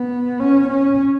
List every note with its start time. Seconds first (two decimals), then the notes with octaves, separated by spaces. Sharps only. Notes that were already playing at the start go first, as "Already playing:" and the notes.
Already playing: B3
0.40 C#4
0.69 C#4